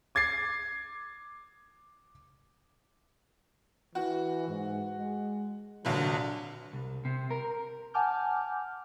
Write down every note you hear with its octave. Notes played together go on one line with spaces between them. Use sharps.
D6 G#6 A6 C7
E3 F#4
G#2
G#3
F1 A#1 D3 F#3
C2
C3
A#4
F#5 G#5 A5 D6 F6 G6